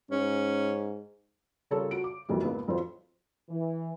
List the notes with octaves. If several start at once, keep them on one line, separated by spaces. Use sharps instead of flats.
G#2 C#4
C#3 G3 F4 A4 A#4 C#5
F#4 D7
D6
F2 G#2 E3 F#3 G3 A#3
C#2 G#2 A#3 B3
F2 F3 F#4 C5
E3